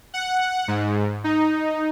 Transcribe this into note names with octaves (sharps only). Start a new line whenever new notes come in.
F#5
G#2
D#4